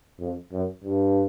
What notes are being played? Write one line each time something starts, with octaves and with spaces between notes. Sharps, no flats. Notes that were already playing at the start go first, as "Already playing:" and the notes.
F2
F#2
G2